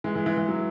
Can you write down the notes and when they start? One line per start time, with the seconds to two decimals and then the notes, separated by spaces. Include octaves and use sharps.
0.04 E3 G#3
0.15 E3 G#3
0.26 E3
0.37 E3
0.49 F#3